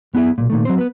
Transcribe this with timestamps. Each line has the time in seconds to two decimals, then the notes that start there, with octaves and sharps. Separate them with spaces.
0.14 F#2 B3 E4 G#4 E5
0.38 B1 A#2
0.50 A#2 D#3 A3
0.65 F#3 C4 C5
0.78 B3 B4